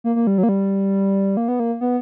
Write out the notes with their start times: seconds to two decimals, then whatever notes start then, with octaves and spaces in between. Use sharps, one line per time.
0.04 A#3
0.16 A#3
0.27 G3
0.38 F#3
0.43 A#3
0.49 G3
1.37 A#3
1.48 B3
1.60 A#3
1.81 B3